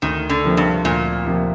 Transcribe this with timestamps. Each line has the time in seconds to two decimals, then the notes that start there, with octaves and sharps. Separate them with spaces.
0.02 D2 D#3
0.30 D3
0.43 C3 F3 A#3
0.57 G2
0.84 D2 A#2
1.25 C3 F3 A#3